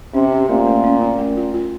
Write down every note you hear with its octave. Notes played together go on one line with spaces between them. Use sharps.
C3 C#4
C#4
A#2 A3
A3
C#4
F4
A3
F4
F4